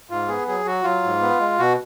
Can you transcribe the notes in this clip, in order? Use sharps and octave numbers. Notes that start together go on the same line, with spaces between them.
G#2 F4
B3 G#4
F#3 G#4
F#3 F#4
F#3 F4
G#2
B3
G#3
B2 F#4